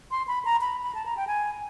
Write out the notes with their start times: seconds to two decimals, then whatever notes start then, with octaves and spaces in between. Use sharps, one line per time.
0.11 C6
0.28 B5
0.45 A#5
0.61 B5
0.83 B5
0.95 A5
1.06 A#5
1.17 G5
1.27 G#5